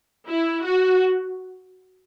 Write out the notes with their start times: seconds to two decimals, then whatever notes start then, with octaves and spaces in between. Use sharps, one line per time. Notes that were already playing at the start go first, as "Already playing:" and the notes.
0.28 E4
0.65 F#4